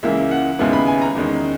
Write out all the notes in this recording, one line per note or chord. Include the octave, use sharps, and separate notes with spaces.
C#2 C#3 E3 A#3 E5
F#5
D#2 C#3 G#3 B3 E4
B5
G#5
A#5
E2 D#3 G#3 C#4